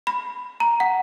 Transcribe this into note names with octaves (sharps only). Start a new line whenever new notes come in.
B5
A#5
F#5